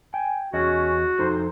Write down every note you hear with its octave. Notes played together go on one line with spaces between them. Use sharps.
G5 G#5
E2 C#4 F#4 G#4 D#5
F2 D#4 A4 C5